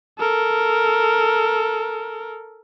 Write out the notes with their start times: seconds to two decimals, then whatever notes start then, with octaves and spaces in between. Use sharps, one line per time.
0.19 A4 A#4